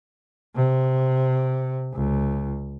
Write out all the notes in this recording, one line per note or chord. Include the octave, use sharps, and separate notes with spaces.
C3
C#2